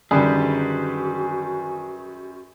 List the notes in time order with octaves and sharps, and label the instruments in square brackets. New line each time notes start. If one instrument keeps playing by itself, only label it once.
[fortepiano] F#2 G3 [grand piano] D3 D#3 [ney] F#4 [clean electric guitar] G#4 B4 C5